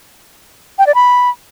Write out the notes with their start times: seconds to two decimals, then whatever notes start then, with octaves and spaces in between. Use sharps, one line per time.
0.79 G5
0.87 D5
0.95 B5